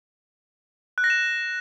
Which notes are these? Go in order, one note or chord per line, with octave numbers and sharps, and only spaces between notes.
F#6
A#6
E7